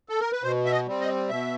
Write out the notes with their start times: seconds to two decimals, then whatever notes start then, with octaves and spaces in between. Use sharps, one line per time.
0.09 A4
0.20 A#4
0.32 B4
0.43 B2 C5
0.65 E5
0.72 D#5
0.87 G3 C4
1.01 D#5
1.29 B2 E5